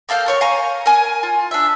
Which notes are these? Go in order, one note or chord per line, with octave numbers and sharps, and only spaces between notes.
A#3 A4 F5 G5
A#4 C#5 C#6
F5 G#5 A#5 C#6
A#4 G#5
F4
D4 E5